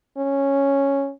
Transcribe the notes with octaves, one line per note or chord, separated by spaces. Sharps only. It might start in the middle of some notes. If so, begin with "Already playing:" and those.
C#4